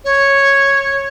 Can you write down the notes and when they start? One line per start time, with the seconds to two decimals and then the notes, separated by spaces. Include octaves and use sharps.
0.05 C#5